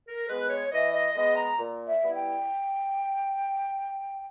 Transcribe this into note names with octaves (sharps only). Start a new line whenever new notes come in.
A#4
G#3 B3 B4
C#5
E3 D#5
D#5
G#3 B3 D#5
A#5
A#2
E5
G3 B3 E4
G5